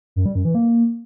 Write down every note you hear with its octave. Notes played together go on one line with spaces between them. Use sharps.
F#2
G3
F#2
E3
A#3